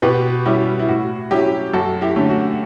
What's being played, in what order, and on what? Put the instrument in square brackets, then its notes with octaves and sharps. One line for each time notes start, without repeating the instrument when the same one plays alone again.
[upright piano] B2 G4 B4
G3 C#4 E4 G4
E4
A2 F#4
F#3 C#4 E4 G4
F#2 F#4 A4
E4 G4
D3 A3 C#4
F#4